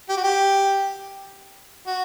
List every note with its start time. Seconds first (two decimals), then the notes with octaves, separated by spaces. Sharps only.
0.09 G4
0.17 F#4
0.24 G4
1.87 F#4